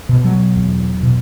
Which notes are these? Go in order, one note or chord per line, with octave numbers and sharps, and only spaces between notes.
B2
F#3
E2
B2